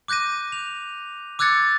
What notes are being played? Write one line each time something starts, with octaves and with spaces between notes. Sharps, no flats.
D6 F#6 G6 A#6 D#7
F7
D6 E6 F#6 G#6 A6 C#7